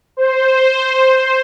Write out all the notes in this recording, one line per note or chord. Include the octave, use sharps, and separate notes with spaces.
C5